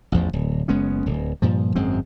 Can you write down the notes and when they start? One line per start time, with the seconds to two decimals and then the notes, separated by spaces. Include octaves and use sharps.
0.12 A1 E2 F3
0.33 D1
0.68 F#1 G#3 B3 C#4
1.06 D1
1.42 G2 A#2 F3
1.75 G#1 F#2 G#3 C4